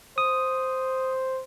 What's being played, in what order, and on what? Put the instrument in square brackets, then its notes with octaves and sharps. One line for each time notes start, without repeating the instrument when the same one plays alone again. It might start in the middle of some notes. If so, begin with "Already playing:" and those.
[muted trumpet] C5 [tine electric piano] D#6